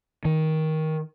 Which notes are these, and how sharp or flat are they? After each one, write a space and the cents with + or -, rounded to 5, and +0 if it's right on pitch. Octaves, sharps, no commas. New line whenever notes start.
D#3 +15